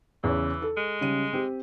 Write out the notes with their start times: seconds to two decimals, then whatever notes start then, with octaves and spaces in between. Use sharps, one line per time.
0.24 E2 C#3 E3 C#5
0.62 A4
0.77 G#3
1.01 C#3 G3 D#7
1.33 C4 G4